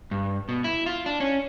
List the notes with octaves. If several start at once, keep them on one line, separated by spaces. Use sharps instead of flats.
G2
B2
E4
F4
D4
C#4